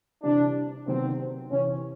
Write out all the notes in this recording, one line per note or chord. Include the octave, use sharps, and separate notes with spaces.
C3 E3 G3 D4
C3 D#3 F#3 B3 C4
E2 C3 E3 C#4